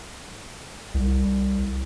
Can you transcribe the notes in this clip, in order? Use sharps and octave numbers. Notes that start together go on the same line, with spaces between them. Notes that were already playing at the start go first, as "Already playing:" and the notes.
C2